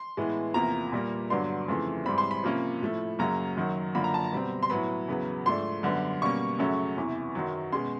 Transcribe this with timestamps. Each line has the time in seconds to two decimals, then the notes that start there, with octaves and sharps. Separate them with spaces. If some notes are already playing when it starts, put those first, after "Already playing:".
Already playing: C6
0.17 A2 E3 G#3 B3
0.54 E2 C3 F3 A#3 A#5
0.92 A#2 G3 A#3
1.30 G2 D3 F#3 B3 D4 C6
1.68 F2 C#3 E3 A3
2.05 G#2 E3 G3 C4 B5
2.18 C6
2.31 B5
2.43 C3 F3 A#3 C#4
2.82 A2 F3 A3
3.19 F#2 C#3 F#3 A#3 C#4 A#5
3.57 F#2 D#3 F#3
3.95 F#2 D3 F3 A#3 B5
4.04 A#5
4.14 A5
4.24 A#5
4.32 B2 G3 C4
4.63 C6
4.70 A2 F#3 B3 B5
5.08 E2 C#3 F#3 B3
5.46 G#2 F3 A3 D4 C6
5.83 F#2 D3 G3 B3
6.22 B2 G3 A#3 C#4 C#6
6.59 F#2 C#3 F#3 A3 C#4
6.97 E2 C3 E3
7.35 F#2 D#3 F#3
7.72 B2 G#3 C#4 C6